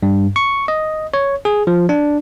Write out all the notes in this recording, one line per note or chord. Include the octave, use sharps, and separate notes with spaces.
G2
C#6
D#5
C#5
G#4
F3
D4